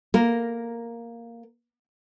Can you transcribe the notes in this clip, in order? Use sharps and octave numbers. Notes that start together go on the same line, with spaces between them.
A#3 A#4